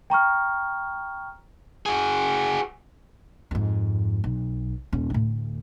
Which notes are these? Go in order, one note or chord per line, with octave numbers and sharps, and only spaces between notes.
G5 A#5 C#6 F6
F#4 G#4
F2 G#2
B1
D#1 C#4
D2 A2